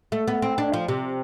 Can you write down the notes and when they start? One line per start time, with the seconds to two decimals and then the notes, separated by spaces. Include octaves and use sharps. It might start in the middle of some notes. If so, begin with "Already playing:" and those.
0.12 A3
0.27 B3
0.42 C4
0.58 D4
0.73 F3
0.88 C3